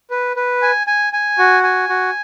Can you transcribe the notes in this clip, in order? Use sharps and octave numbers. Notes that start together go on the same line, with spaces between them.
B4
B4
G#5
G#5
G#5
F#4
G#5
F#4